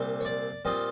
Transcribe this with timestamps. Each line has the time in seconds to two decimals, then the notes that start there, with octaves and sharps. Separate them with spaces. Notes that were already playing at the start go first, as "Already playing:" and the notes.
Already playing: C2 A#2 G3 C4
0.21 C#5
0.25 D5
0.65 A#2 G3 C4 F4 D#5